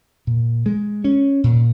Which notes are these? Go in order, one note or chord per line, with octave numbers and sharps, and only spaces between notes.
A#2
G#3
C#4
A#2